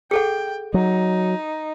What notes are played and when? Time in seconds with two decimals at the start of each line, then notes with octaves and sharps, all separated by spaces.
0.11 G#4 A4 F#5 G5
0.74 F#3 D#4